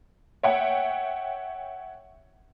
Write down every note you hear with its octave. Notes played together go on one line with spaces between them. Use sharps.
C#5 E5 F#5 G5